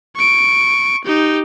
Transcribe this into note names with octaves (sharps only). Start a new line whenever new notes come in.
C#6 D7
D#4 G4